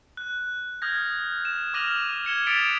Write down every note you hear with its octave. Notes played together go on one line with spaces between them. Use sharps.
F#6
D#6 F6 G6 G#6 A#6
E7
D6 F6 A#6 D#7 F7 F#7
G#6 C#7 E7 G7
D#6 A6 B6 C#7 D7 F7